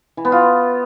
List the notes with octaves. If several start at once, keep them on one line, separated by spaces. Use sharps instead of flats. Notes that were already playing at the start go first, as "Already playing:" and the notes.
E3
B3
F4